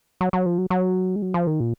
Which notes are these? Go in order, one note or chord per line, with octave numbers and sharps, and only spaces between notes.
F#3
F#3
F3
F#3
F#3
G#3
F#3
F3
D#3
A#2